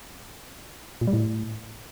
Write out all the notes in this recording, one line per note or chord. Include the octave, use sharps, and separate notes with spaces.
A#2
G3
A2